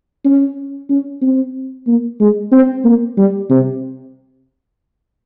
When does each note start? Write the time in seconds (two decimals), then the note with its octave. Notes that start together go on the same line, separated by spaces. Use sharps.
0.25 C#4
0.90 C#4
1.22 C4
1.87 A#3
2.20 G#3
2.52 C4
2.84 A#3
3.17 G3
3.50 C3